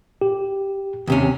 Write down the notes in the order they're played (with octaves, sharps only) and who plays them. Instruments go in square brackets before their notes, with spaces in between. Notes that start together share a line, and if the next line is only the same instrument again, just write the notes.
[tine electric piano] G4
[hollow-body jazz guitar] D#2 C3 C#4